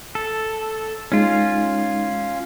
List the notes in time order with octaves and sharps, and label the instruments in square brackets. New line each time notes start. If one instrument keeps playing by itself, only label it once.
[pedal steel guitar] A4
[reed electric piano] G#3 D#4 [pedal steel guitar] C#4 F4